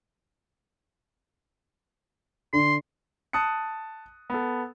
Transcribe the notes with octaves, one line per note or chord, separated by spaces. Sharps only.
D3 C6
A5 D#6 F#6 C#7
B3 A4